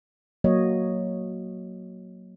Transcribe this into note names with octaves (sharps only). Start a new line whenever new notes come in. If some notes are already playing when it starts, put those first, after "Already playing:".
F#3 A#3 C#5 D#5